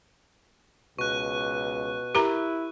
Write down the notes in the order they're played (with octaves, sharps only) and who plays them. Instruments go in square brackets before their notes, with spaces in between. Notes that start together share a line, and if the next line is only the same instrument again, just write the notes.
[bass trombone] C#2 [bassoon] B2 [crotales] C#6 F#6
[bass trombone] E4 [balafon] G4 A#4 A#5